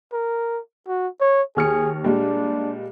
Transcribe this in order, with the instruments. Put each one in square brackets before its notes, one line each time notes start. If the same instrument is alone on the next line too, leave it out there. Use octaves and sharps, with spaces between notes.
[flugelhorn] A#4
F#4
C#5
[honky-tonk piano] D#2 F6 C#7 [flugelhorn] G#4
[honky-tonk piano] A#2 G3 G#3 [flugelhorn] D4